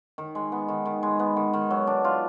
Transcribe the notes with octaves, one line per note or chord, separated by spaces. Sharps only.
D#3
G#3
B3
D#3
D#3
G#3
B3
D#3
D#3
F#3
D4
F4